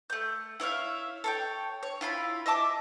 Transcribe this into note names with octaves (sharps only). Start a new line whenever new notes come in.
A3 G6
E4 C#5 E5 F5
A4 C#5 G5
C#5
E4 F4 B5
D#5 E5 A5 D6